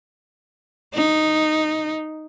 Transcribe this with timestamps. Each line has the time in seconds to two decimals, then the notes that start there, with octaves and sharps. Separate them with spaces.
0.95 D#4